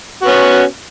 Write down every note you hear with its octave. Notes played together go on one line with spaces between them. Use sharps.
B3 C#4 F#4